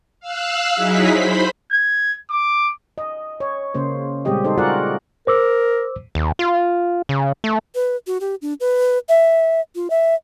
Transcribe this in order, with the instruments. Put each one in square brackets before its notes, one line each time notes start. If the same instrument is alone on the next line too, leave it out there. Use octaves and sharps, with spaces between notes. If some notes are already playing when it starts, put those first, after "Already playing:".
[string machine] F5 E6 F#6
F#3 D#4 E4 G#4 B6
C5 B5
[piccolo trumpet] G#6
D6
[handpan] D#5
C#5
C#3 A#3 C5
A#2 G3 G#3 C4 G4 D#5
D#4 A4 C5
F4 F#4 G#4 A#4 D5 F#5
[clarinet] A#4 [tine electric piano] C5 D6 E6
[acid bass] D#2
F4
C#3
A3
[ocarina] B4
F#4
G4
D4
B4
E5
F4
E5